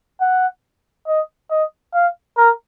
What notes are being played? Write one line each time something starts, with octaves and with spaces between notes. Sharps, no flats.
F#5
D#5
D#5
F5
A#4